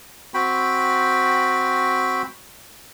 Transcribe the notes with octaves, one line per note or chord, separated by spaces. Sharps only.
C4 F#4 G5 B5